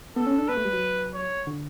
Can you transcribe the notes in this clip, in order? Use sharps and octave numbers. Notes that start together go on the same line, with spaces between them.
B3 A4
C#4
D4
B3 B4
A3
G3
F#3
C#5
D3